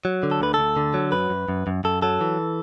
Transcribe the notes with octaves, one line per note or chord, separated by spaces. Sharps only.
F#3
D3
A4
D2 B4
D2 A4
D3
F#3
F#2 B4
F#2
F#2
F#2
F#2 A4
F#3 A4
E3